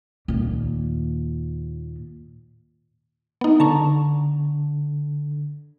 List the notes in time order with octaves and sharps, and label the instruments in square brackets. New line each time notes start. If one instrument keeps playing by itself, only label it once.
[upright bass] D#2 A#2
[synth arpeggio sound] B3 D#4
[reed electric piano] D3 [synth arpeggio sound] A5 A#5 C#6